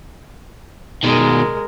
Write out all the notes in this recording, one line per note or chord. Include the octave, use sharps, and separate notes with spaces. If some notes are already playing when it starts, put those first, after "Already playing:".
B2 D#3 G#3 A#4